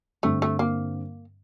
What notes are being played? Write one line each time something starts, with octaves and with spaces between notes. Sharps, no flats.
G2 D3 G3 A3 C4
A3
A#3